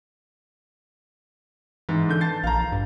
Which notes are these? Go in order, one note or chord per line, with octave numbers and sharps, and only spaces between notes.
G#2 E3
D3 G6
A5 A6 C7
A#1 F5 A#5
G2